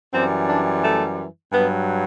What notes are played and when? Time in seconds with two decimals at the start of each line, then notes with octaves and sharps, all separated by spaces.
0.13 F#2 E3 G3 C4
0.48 D4
0.83 A3
1.53 G2 F#3 B3